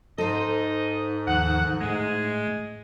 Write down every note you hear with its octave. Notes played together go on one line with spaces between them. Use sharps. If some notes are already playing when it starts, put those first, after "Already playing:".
G#2 D#4 A4 C5 D#5
D#2 D#3 F3 F#5
A2 G#3 A3